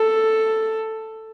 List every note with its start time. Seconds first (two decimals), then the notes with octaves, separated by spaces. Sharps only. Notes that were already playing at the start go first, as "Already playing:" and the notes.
Already playing: A4